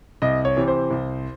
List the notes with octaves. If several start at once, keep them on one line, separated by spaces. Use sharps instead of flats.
C2 D#5
C#5
C3 E3
C5
C2